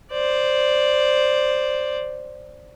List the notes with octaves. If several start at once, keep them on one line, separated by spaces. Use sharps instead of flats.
C5 D5